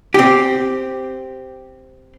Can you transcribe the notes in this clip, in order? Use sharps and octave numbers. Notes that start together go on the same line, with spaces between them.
C4 G4